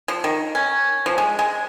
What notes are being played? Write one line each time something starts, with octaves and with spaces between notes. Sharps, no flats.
F3
D#3
C#4
F3
G#3
G#3